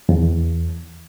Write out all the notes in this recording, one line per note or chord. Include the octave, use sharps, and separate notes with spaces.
E2